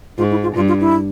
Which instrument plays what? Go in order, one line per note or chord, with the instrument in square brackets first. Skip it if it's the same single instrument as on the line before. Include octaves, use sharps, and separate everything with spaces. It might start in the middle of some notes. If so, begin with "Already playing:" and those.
[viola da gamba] G#2 [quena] F4
[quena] E4
F4
[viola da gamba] G2 [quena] F4
[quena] F4
E4